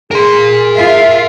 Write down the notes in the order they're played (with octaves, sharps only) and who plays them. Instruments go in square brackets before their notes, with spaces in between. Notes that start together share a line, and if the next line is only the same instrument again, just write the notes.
[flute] G#4 [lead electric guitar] A#4 C6
[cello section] F4 E5 F5